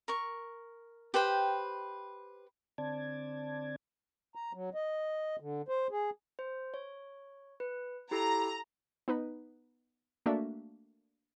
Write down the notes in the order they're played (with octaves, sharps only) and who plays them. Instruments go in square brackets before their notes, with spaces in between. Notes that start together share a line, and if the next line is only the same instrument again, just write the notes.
[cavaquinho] A#4 C#6
G4 B4 C5 G5
[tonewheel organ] D3 C4 D5 A5 G#6
[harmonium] A#5
F#3
D#5
D3
C5
G#4
[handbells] C5
C#5
B4
[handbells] E4 G4 A4 [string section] A#5
[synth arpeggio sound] B3 D#4 B4
A3 A#3 D4 F#4 E5